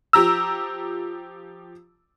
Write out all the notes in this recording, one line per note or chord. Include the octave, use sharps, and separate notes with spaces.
F3 G4 A#5 E6